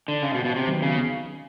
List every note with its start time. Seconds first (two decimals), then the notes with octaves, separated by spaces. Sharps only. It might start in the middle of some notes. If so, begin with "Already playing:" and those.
0.08 D3
0.22 C#3
0.34 B2
0.45 B2
0.56 C3
0.67 D#3 F#3 B3
0.82 C#3